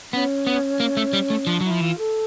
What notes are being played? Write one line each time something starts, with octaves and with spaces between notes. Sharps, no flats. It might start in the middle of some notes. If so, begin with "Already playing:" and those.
B3 C#4
B3
A#3
A3
G3
A3
F3 D4
F#3 E4
F3
E3 F4
A4